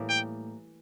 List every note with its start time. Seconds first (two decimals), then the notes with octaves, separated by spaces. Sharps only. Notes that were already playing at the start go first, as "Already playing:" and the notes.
Already playing: A2 E3 G3 A#3
0.09 G5